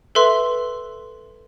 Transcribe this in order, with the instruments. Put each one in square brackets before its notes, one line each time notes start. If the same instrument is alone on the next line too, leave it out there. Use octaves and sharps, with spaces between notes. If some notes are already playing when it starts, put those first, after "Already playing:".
[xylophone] A4 B4 E5 C6